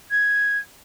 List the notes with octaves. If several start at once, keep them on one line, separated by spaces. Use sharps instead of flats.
G#6